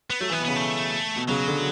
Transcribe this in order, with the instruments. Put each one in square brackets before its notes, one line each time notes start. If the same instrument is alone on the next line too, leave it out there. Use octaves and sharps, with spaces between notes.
[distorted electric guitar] B3
[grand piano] F#3 [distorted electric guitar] A3
[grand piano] E3
[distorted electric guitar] B3
[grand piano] B2
[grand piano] C#3 [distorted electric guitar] B3
[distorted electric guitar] A3
[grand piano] B2
[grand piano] C#3 [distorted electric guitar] F#3
[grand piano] D3